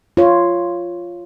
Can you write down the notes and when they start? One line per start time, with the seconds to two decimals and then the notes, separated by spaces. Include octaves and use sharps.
0.17 F4 C#5